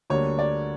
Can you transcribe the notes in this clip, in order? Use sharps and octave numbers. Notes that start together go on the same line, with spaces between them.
D2 D3 G3 A#3 C#5
D5